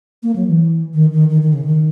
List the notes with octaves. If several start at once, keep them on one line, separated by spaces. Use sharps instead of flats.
A#3
F#3
E3
D#3
D#3
D#3
D#3
C#3
D#3